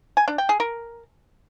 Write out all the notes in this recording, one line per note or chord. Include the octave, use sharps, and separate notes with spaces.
G#5
D4
G5
G#4
A#4